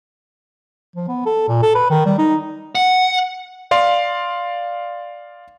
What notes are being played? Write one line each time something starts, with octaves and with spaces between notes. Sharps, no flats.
F3
B3
A4
A#2
A4
B4
D#3
G3
D#4
F#5
D5 F5 C6